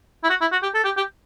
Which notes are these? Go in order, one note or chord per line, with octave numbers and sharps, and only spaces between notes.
E4
F#4
E4
F#4
G4
A4
G4
G4